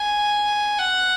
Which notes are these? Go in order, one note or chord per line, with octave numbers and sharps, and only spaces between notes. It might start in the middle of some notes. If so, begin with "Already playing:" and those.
Already playing: G#5
F#5